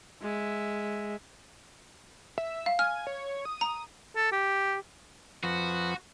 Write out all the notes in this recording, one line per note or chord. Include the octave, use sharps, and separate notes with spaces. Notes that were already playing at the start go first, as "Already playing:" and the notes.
G#3 E5
E5
F5
G#5 F6
C#5
D#6
A#5
A4
G4
F2 F3 F#4 B4